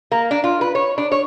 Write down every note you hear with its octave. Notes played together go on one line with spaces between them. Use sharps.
A#3
D4
F4
B4
C#5
D4
C#5